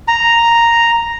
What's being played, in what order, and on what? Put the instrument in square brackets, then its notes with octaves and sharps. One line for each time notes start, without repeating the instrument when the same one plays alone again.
[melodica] A#5